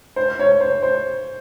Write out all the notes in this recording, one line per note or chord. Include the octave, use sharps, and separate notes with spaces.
C5
C#5
C5
C5